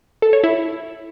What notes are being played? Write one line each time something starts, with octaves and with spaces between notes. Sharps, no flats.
A4
C#5
E4